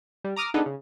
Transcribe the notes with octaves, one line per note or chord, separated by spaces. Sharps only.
G3
A#5 D6 D#6 F6
B3 D4 D#4 G#4 A4 B4
C#3